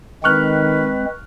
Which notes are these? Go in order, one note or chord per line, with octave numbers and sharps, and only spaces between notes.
D#3 G#3 C4 B4 C#6 F6 F#6